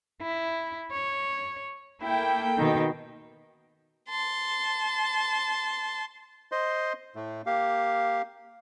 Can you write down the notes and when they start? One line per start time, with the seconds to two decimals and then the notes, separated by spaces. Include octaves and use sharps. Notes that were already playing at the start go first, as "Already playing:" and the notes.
0.22 E4
0.92 C#5
2.03 A#3 E4 A4 G5
2.58 B2 D#3
4.10 A5 C6
6.52 C5 D#5 C6
7.16 A2 A3
7.46 A#3 G4 F5